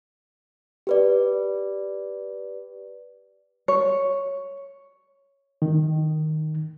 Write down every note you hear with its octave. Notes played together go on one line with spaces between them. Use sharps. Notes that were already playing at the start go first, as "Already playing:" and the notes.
G4 B4 D5
C#5
D#3